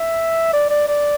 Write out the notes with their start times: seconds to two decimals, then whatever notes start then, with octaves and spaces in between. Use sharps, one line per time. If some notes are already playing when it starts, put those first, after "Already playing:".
Already playing: E5
0.53 D5
0.70 D5
0.88 D5